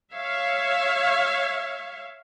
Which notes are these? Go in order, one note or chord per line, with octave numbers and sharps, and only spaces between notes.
C#5 E5 F5